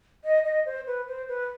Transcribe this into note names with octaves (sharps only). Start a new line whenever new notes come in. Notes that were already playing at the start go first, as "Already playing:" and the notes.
D#5
D#5
C5
B4
C5
B4